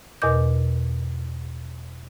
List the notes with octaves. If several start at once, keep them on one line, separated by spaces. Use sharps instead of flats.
E2 B2 A#4 D#5 D6 G6